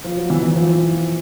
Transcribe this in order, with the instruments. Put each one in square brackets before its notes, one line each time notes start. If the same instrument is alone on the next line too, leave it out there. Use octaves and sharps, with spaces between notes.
[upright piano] F3
F#3
E3
E3
F3
F3